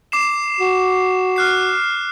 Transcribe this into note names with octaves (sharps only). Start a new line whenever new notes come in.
D6 C7 E7
F#4
F6 F#6 C7